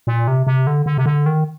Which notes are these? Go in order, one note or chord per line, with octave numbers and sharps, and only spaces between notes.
A#2
C3
C3
D3
D3
C3
D3
D#3